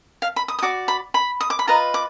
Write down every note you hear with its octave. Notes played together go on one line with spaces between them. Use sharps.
F5
B5
D#6
D#6
F#4 D5 D6
B5
B5
D#6
D6
B5
F4 B4 D#5 A#5
D6